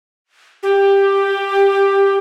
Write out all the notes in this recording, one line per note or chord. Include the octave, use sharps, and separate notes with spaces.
G4